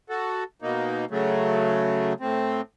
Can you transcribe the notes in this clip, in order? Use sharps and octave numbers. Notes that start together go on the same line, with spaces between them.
F#4 A4
B2 A#3 D#4
C#3 F#3 A3
A2 C4